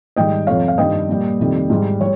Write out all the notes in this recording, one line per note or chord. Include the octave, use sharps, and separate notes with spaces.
G#2 D#3 G3 D#5 G5
F2 C3 F3 C#5 F5
F5
G2 D#3 G3 D#5 G5
A#2 G3
F2 C3 D#3 G3
G#2 G3
G3 C#5